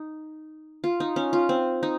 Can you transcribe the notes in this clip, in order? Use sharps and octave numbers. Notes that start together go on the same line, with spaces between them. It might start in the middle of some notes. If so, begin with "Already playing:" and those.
Already playing: D#4
F4
D#4
C#4
F4
C4
D#4